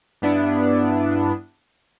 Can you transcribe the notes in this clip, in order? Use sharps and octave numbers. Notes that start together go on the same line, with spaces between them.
G2 B3 D4 E4